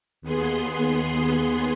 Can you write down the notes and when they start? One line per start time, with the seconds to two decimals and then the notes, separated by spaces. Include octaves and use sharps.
0.22 D#2 B3 G#4 C6